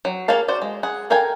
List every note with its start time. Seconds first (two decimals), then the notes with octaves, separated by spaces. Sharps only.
0.05 F#3
0.28 A#3 G#4 C#5 F5 A5
0.48 F#4 C5 D5
0.62 G#3
0.83 G#4 F#5
1.10 A4 A#4 F5 G5 G#5